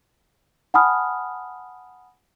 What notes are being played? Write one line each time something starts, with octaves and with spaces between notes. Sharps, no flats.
F#5 G#5 A5 B5 D#6 F6